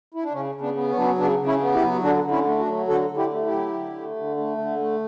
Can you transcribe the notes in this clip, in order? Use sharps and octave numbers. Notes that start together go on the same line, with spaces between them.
E4
D4
C#3 C#4
C#3
B3 D4
B3
C#4
F#3 D4
C#4
C#3 B3 D4
C#3
C#4 E4
B3
E4 G4
F#3
D3 D4 F#4
D3
C#4 E4
A3
D4 F#4
F#3
D3 F#4 A4
D3
E4 G4
A3
E4 G4
F#3
D3
A3
D3
A3
D3
A3